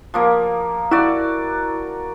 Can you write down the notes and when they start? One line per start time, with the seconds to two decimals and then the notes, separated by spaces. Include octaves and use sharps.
0.14 F3 A#3 A#4
0.91 E4 F#4 D5